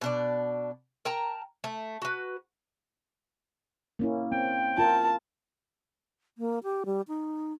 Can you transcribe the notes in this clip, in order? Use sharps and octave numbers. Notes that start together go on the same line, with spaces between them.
B2 D4 D5
A#4 G5 A5 A#5
A3
F#4 B4
A#3 C#4 E4
C4 G5
F4 A#4 A5
A#3
G4
G3
D#4